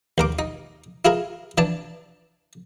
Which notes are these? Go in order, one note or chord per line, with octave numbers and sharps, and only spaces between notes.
D#2 A#4 D6
D#4
E4 F4 G#4 A#4
E3 D4 A5